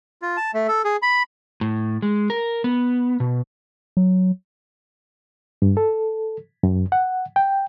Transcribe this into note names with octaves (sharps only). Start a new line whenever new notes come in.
F4
A5
A3
A4
G#4
B5
A2
G#3
A#4
B3
B2
F#3
G2
A4
F#2
F#5
G5